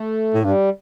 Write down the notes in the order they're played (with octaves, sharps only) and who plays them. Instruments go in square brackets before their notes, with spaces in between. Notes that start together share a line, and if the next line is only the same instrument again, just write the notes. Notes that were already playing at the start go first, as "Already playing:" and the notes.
Already playing: [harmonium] A3
[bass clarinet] A2
[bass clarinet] G2 [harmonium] G3